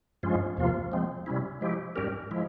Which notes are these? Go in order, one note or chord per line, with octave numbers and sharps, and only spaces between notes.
G2 F3 G#3 C#4 F4
E2 C3 F3 A#3 F4
F3 G#3 C4
C3 G3 C#4 E4
F3 G#3 E4 G4
G#2 G3 C#4 G4 A#4
F3 G#3 E4